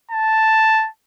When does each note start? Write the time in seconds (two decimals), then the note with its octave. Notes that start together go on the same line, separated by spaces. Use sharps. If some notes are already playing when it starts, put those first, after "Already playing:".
0.11 A5